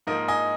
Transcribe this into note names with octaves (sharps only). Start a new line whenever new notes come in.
G#2 F3 A#3 A#4 D#5
D#5 G#5